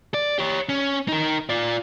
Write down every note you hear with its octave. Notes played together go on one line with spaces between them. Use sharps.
D5
G4 C#5
C#4
D#4 A#4
F4 D5